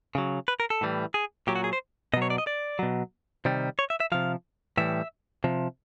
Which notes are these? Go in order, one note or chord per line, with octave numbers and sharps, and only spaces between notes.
C#3 F#3
B4
A#4
A4
A2 E3 G3
G#4
A#2 F#3 G4
F#4
G#4
C5
B2 F#3 C#5 D#5
D5
D#5
D5
B2 F#3
C3 D#3 G3
C#5
E5
E5
C3 F3 F5
A2 E3 G3 E5
C3 F3